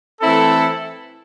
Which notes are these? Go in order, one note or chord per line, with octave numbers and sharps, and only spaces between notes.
E3 A3 C4 E4 A4